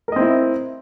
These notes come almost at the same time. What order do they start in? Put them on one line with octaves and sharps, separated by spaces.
A#4 D#5 C4 E4